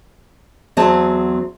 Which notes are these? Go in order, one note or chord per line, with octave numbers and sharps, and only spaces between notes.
E2 F#3 C4 G#4 A5